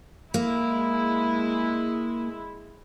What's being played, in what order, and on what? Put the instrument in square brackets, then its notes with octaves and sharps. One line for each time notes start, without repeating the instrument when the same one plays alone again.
[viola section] G#3 E4 [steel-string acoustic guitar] A#3